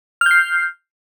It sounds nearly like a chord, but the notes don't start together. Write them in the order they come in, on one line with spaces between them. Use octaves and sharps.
F6 G6 C7